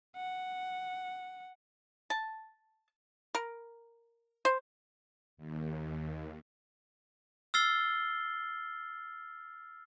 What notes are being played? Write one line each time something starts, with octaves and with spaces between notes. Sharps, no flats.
F#5
A5
A#4
C5
D#2
E6 F6 A6 C7 G7